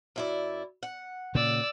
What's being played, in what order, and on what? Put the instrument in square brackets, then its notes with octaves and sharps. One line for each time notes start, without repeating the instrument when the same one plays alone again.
[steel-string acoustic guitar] F#2 E4 D5
F#5
[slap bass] A#2 C#3 [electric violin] D5 E6